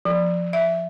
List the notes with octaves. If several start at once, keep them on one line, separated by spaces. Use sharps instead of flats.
F3
E5